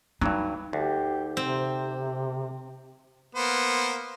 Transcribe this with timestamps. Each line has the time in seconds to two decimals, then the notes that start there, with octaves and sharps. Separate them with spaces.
0.21 G2 E3 F#3 D#4
0.73 D2 G4
1.37 C3 C4
3.35 A#3 B3 C5